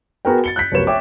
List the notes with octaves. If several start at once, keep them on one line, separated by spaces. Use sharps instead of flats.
B3 F#4 G#4 A#4 F#5 G5
A6 C#7 G7
F#6 G6 B6
F1 B1 A#4 B4 C#5 E7
C#5 E5 G5 D6